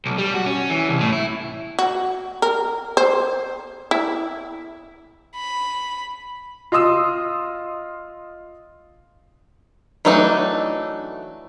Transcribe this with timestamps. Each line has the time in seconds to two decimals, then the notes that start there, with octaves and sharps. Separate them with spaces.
0.06 B1
0.18 G3
0.34 F#4
0.46 C#4
0.70 E3
0.88 C2
1.00 A2
1.13 E4
1.79 F#4
2.42 A#4
2.97 C5
3.91 E4
5.35 B5
6.72 F4 D#5 C6 D#6 E6
10.05 E3 F#3 A3 D4 D#4